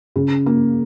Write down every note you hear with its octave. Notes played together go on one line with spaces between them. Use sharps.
C#3
A#3